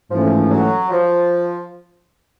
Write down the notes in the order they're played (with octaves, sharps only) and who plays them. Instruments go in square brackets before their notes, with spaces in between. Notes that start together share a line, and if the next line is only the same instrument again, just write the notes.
[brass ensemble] G#2 E3 A3 C#4 [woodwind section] F3
[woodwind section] F#3
F3